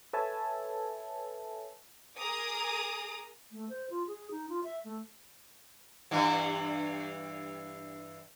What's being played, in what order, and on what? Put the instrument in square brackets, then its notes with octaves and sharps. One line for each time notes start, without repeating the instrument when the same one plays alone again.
[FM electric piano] A4 B4 C#5 E5 G#5 A5
[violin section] G#4 A#4 A#5 D6 D#6
[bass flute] A3
C5
F4
G#4
D#4
F4
E5
A3
[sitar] G2 E3